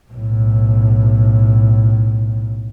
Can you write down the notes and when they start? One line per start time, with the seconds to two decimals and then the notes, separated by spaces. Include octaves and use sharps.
0.11 B1 A2